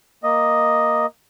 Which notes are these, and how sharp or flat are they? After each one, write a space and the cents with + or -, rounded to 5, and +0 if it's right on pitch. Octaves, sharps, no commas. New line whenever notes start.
A#3 +5 D#5 +0